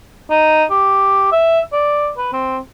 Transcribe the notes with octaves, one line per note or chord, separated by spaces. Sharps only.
D#4
G4
E5
D5
B4
C4